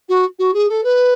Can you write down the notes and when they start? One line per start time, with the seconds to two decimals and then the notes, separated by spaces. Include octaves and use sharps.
0.09 F#4
0.39 F#4
0.54 G#4
0.69 A4
0.84 B4